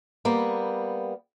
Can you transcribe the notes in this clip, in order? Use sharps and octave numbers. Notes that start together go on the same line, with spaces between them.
G3 A#3 B3